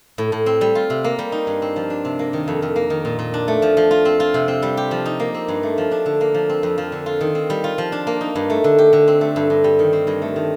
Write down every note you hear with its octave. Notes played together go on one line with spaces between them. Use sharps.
A2
A2
C4
G3
F4
C3
A#3
G3
D#4
G2
C4
F3
D4
C3
A#3
D#3
F2
F2
A#3
D#3
A#2
A#2
D4
A3
F3
F3
F4
C4
F4
C3
C4
G3
G4
F3
D#4
A#3
C4
G2
A3
F3
D4
D3
A#3
F3
C4
F2
F3
D3
F4
D#3
C4
G3
F4
F3
D4
A#3
D#4
G2
A3
D3
G4
D3
C4
A3
G2
G2
G3
D#3
C4
G2
A3
D#3